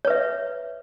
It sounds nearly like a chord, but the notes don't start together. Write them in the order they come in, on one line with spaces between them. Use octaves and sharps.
C#5 B4 E5